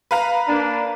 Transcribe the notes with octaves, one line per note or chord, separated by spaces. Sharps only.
B4 F5 A#5
A#3 D4